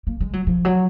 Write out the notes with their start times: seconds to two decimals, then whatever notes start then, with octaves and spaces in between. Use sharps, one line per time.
0.07 A#3
0.20 G#3
0.33 F#3
0.47 F3
0.65 F#3